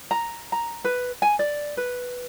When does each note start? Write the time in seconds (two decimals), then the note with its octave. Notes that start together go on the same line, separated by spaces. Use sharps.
0.11 A#5
0.52 A#5
0.85 B4
1.22 G#5
1.39 D5
1.77 B4